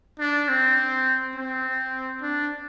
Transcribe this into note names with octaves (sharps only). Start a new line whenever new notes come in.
D4
C4
C4
D4